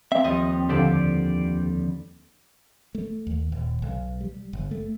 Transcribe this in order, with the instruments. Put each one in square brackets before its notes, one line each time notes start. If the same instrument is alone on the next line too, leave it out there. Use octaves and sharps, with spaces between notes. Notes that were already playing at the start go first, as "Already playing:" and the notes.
[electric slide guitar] C4 [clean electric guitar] E5
[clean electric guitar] D#2 F3 G3 [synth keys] D#5
[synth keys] F2 D3 [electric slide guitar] G4 C5 D5
[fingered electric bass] A3
D#2
D#1
B1
G3
G1
A3